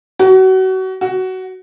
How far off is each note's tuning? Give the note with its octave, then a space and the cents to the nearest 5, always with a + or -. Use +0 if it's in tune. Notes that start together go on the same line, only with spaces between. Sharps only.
F#4 +30
F#4 +15